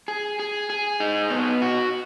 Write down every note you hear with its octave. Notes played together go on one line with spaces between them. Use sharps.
G#4
G#4
G#4
D#4
B3
F#4